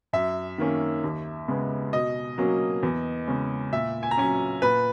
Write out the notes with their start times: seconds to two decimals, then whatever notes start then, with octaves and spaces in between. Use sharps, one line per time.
0.13 F#2 E5
0.58 D#3 A#3 C#4
1.04 D#2
1.48 C#3 G#3 B3
1.93 B2 D#5
2.38 F#3 A#3 C#4
2.83 E2
3.28 C#3 G#3 C#4
3.73 A#2 E5
4.03 G#5
4.11 A#5
4.18 F#3 C#4 G#5
4.62 A#2 B4